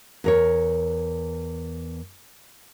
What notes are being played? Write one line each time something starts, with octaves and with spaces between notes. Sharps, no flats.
E2 A#4 C#5